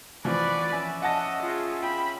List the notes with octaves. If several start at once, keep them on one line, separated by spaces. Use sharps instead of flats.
E3 F3 B3 B4 D5 C#6
C#4 E5 G#5
D#5 F#5 A5 A#6
F4 G#4
G5 B5